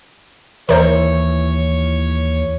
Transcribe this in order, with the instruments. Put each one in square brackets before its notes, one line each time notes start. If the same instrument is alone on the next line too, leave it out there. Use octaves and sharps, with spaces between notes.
[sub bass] D#2 [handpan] E3 E5 [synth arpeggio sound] A#4 C5 [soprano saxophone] C#5